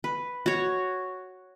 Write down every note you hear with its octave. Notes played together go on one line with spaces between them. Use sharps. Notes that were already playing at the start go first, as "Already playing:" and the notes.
B4
F#4 C#5